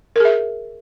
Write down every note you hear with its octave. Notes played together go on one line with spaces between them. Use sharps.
G#4 A#4 E5